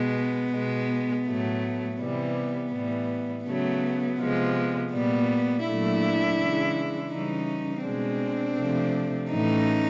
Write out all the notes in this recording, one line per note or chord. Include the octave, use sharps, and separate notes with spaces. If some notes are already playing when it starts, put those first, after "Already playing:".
Already playing: B2 G#3 B3
B2 G#3
A2 F#3 A3
C3 E3 G3 B3
A2 E3 G3
C#3 F#3 A3 B3
C3 F3 G#3
A#2 G3 B3
A#2 F#3 A3 D4 E4
C#3 E3 G#3
C#3 E3 G3 C#4 D#4
B2 G#3 C4 D4
C3 F3 A3
A2 E3 A3 C#4 D#4